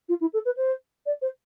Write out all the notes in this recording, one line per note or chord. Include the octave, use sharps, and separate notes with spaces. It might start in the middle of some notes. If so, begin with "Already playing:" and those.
F4
E4
A4
B4
C5
D5
C5